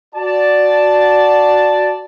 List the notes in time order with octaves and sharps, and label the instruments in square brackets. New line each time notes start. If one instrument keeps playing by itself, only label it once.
[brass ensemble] F#4 D5 A5